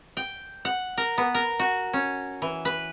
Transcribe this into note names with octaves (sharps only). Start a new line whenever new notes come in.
G5
F#5
A#4
B3
A#4
F#4
C#4
E3
B4